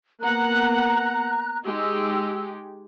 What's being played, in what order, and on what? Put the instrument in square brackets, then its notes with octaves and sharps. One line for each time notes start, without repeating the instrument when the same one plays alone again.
[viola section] A#3 B3 F#5 [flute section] A#5 F#6
[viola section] G#3 D#4 G4 [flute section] E6